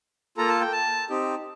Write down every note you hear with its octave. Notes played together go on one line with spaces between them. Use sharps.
A#3 F4 A4 A#5
A5
G5
A5
C4 D#4 G4